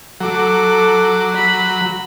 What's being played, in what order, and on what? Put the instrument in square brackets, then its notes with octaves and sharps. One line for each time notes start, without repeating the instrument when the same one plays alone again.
[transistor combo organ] F#3 [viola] A4 D6
[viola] B5